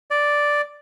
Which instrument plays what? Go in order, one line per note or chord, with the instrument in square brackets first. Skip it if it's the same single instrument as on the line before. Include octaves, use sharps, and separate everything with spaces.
[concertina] D5